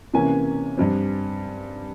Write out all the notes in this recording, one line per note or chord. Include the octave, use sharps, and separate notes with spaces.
C3 E3 A#3 C#4 G#5
G2 G3 C4